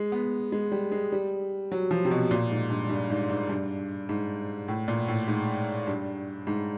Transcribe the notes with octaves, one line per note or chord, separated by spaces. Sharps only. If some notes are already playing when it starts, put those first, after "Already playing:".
Already playing: G#3
B3
G#3
G3
G#3
G3
F#3
F3
C3
B2
A#2
G#2
G2
G2
G#2
G#2
G2
G#2
A2
A#2
A2
G#2
G2
G#2